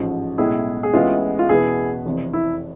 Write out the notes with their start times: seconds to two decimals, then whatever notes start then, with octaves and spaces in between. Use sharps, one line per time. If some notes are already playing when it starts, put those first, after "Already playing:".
Already playing: A1 G#2 F3
0.38 B1 A2 G#3 E4 G#4
0.83 G#4
0.93 A1 A2 G#3 B3 E4 F4
1.39 F4
1.49 E2 B2 B3 E4 G#4
2.05 F1 F2 E3
2.33 E4